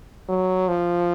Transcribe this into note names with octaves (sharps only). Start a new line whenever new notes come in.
F#3
F3